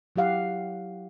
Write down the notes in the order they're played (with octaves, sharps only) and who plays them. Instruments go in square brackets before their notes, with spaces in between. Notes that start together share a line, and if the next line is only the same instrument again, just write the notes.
[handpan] F#3 E4 G4 F5 F#5